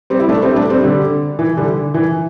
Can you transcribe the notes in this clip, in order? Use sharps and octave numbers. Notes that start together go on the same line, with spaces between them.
G3 C4
E4
A3 D4
G3 C4
A3 D4
G3 C4
D3 G3
E3
D3 G3
E3